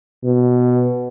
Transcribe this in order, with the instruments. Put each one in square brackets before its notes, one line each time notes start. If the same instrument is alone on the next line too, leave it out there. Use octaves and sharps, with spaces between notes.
[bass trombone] B2